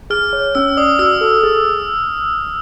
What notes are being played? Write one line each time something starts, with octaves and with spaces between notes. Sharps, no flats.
G#4 F6
C#5
C#4 E6
D5 D#6
F#4 E6
A4
G#4